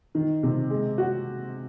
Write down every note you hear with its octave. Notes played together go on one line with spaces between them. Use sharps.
D#3
C3
G#3
F#4